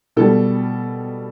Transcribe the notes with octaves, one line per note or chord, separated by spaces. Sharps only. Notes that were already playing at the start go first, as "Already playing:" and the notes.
B2 G3 A4